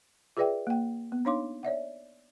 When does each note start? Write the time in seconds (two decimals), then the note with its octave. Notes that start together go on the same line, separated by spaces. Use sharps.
0.37 F4 G#4 B4 D5 E5 G5
0.67 A#3 G5
1.12 B3
1.25 D4 D#4 C#5 F5 C6 D6
1.63 C#5 D5 E5 F#5